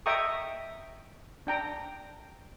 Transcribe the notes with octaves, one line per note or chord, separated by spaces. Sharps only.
D#5 E5 G5 A#5 C#6 D#6
D4 G5 A#5